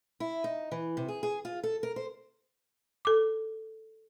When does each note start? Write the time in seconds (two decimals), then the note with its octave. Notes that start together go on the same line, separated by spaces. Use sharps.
0.20 E4
0.44 D#4
0.72 E3
0.97 C3
1.08 G#4
1.23 G#4
1.45 F4
1.63 A4
1.83 A#4
1.96 C5
3.05 A4 D6